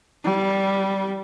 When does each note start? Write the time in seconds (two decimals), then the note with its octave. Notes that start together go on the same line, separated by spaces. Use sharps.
0.24 G3